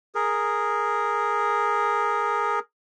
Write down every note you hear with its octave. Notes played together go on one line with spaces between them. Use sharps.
G#4 A#4